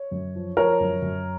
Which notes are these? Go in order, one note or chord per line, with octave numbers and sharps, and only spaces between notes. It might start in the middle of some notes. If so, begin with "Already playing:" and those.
Already playing: C#5
F#2
F3
F3 A#4 C#5
F#2
F#2